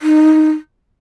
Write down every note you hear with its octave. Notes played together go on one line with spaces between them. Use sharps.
D#4